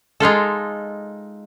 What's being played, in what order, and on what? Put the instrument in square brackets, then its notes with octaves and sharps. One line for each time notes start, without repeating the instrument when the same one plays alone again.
[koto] G#3 D#4 F4 A4